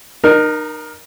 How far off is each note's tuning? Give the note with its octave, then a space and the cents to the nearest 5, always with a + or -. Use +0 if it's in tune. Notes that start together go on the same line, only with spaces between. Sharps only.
D#4 -30 A#4 +15